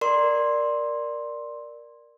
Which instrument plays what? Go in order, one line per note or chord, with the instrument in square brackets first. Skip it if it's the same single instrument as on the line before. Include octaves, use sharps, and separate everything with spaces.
[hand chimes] A#4 D5 C6